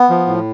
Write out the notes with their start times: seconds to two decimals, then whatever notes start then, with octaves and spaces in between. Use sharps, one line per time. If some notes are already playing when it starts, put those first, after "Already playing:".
Already playing: B3
0.10 F3
0.27 A2